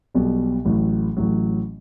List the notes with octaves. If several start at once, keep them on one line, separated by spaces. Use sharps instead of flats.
B1 B2 G3
A1 A2 F#3
A1 A2 F#3